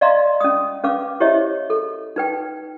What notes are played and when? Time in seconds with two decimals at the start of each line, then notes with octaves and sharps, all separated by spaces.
0.01 D5 D#5 F5 A#5 C6
0.40 C#4 D#6
0.84 C#4 B4 F5 D6
1.20 E4 G4 C5 C#5 D#5 E5
1.70 A4
2.16 D#4 B4 G5